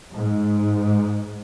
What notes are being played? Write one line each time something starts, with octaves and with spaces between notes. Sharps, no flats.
G#2